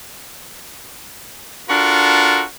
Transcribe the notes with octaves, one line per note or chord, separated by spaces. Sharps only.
D4 F4 F#4 A4 A#4